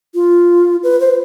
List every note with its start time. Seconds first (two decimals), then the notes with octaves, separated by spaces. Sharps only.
0.15 F4
0.83 B4
1.00 C5